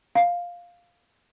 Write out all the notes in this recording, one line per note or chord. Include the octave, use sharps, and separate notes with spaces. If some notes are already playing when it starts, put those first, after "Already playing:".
F5